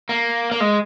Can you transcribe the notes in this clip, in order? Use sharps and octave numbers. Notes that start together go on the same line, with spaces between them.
A#3
A#3
G#3